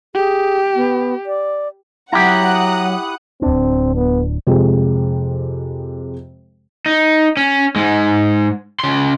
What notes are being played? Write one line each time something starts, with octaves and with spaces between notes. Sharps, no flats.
G4 G#4
B3
D5
F#3 E4 G4 F#5 A#5 D#6 F#6
D1 C4 D4
B3
F2 C3 G#3 G4
D#4
C#4
G#2 G#3
C#3 C6